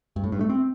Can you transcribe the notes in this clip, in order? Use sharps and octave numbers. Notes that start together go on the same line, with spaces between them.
G2
A2
G2
A3
C4